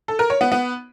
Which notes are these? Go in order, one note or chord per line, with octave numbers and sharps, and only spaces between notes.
A4
A#4
C#5
B3
B3